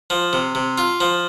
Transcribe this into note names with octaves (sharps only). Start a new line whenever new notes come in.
F3
C3
C3
F4
F3